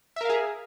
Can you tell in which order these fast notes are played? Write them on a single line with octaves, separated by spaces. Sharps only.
E5 A#4 F5 G#4